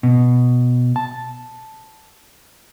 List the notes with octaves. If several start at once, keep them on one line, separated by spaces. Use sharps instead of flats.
B2
A5